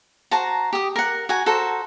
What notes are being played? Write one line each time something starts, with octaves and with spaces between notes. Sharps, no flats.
F#4 C5 A5 A#5
G4 D#6
A#4 F#5
F#4 G#5 A#5
F#4 A4 C5 A#5